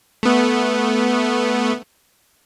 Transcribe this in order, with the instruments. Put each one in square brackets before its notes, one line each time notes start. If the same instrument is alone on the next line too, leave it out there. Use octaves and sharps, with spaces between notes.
[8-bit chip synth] A3 B3